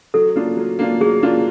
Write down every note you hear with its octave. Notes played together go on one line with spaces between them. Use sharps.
F#3 A4
A#3 D4 F4
F#3
A#3 D4 F4
F#3 G#4
A#3 D4 F4